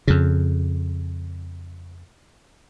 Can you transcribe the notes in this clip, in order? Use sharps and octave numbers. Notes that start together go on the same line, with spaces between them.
F2 C#3